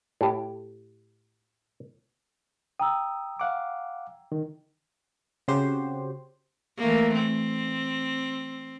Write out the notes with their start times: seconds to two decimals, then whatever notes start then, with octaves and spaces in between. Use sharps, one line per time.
0.21 A2 G4
2.80 G5 A#5 D#6 E6
3.40 F5 F#5 D6
4.32 D#3
5.48 C#3 C4 F#4 G4 C5
6.78 E3 A3 A#3
7.15 C4